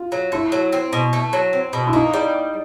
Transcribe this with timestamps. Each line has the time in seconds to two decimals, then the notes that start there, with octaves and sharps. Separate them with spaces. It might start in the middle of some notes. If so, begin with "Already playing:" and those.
Already playing: F4
0.12 F#3
0.32 A3 E4
0.52 F#3
0.73 C4
0.93 B2
1.13 A3
1.33 F#3
1.53 C4
1.73 B2
1.87 E4
1.93 A#3 D#4
2.13 G3